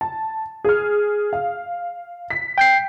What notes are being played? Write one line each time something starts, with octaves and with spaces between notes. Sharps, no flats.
A5
G#4 F6
F5
B6
G5 G6 C7